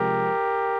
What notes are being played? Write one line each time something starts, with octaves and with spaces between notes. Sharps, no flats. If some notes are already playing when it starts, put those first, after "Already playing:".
Already playing: C3 F3 G#3 G4 A#4